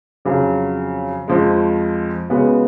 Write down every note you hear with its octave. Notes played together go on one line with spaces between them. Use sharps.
F2 C#3 F#3
F2 F3 G#3
C#3 G#3 B3 F#4